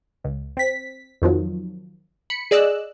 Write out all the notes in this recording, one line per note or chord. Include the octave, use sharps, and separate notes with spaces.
C#2
C4 B6
F2 D#3 F3 F#3
B5 C#7
G#4 D5 D#5 E6 F#6